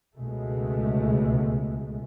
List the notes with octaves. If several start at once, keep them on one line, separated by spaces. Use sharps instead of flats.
C#2 B2 G#3 A3